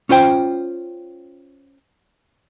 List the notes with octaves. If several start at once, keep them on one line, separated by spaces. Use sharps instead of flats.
C#4 F4 C5 G5